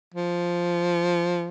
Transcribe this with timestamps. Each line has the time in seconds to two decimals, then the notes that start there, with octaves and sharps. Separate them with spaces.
0.14 F3